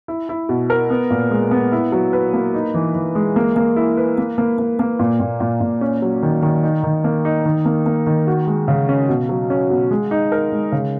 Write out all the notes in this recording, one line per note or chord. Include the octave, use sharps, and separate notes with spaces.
E4
E4
B2
A#4
B3
A#2
G#3
B3
E4
F#3
B4
A#3
D#4
E3
E3
G#3
A#3
A#3
E4
B4
A#3
A#3
A#3
A#3
A#2
A#2
A#2
A#2
C#4
F#3
D#3
D#3
D#4
D#3
A#3
D#4
D#3
A#3
A#3
D#3
F#4
G#3
C#3
C#4
B2
F#3
C#4
B2
G#3
D#4
A#4
G#3
C#3